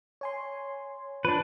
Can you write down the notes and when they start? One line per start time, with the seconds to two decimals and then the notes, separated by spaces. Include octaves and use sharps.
0.21 C#5 G#5 C6
1.25 F3 D4 B4